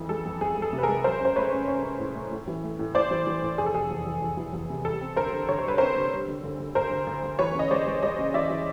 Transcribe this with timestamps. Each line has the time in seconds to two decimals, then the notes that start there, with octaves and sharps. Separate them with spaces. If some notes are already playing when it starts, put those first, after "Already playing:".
Already playing: F2 E3
0.09 G#3 A4
0.25 F2
0.41 F2 G#4
0.57 G#3
0.62 A4
0.73 C3
0.78 B4
0.83 G#4 A#4
0.88 G#3
1.04 F#3 A#4 C5
1.20 C#4
1.25 C5
1.36 A3 B4 C#5
1.52 C#4
1.68 C#4
1.84 C#4
1.99 A2
2.15 A3
2.31 A2
2.48 E3
2.64 A3
2.79 A2
2.95 A2 C5 D5
3.11 E3
3.27 E3
3.42 A2
3.58 F1 G#4
3.66 A4
3.74 F1 G#4
3.90 E2
4.06 E2
4.22 E2
4.37 E3
4.53 E2
4.70 C3
4.85 G3 A4
5.01 C4
5.16 D3 A#4 C5
5.33 D3
5.49 D3 C#5
5.59 C5
5.65 G3 B4
5.78 C4 A#4 C5
5.96 D3
6.12 G3
6.28 D3
6.44 D2
6.60 D3
6.75 D2 A#4 C5
6.91 D2
7.07 D2
7.23 D2
7.39 E3 B4 C#5
7.55 C#3 D#5
7.71 G#3 C5 D5
7.86 G#3
8.02 G#3 C#5 D#5
8.19 C#3
8.34 E3 D5 E5
8.50 E3